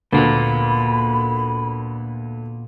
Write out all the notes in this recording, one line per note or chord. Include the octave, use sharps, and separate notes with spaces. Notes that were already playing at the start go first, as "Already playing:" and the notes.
D2 A#2 A#3 B3 B5